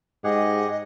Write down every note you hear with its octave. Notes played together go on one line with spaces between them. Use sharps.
G#2 G4 G#4 D#5 F#5